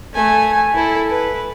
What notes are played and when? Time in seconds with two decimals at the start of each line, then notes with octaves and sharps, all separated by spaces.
0.14 A3 G#5
0.75 E4 A4
1.10 B4